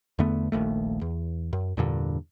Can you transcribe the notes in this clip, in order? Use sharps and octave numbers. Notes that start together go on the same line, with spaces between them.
E2 D3 A3 B3
D#1 A#1 D#2 A3
E2
F#2
E2 G2 A#2 D3